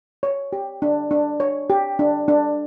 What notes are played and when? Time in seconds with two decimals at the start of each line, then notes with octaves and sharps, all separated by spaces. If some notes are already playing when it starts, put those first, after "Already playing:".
0.23 C#5
0.53 G4
0.82 D4
1.11 D4
1.40 C#5
1.70 G4
1.99 D4
2.28 D4